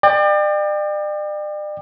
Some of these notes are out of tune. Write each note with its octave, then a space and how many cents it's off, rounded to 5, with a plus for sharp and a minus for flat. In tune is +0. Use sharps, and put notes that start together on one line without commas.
D5 +40 G5 +20